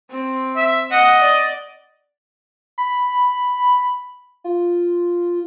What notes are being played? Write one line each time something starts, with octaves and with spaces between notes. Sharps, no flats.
C4
E5
D#5 F#5
D5
B5
F4